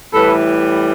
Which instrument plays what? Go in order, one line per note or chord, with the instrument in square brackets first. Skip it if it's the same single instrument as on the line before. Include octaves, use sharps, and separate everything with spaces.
[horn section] A2 E3 G3 A4 B4